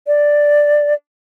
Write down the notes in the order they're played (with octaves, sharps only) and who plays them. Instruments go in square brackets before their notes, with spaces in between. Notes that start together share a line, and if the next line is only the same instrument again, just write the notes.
[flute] D5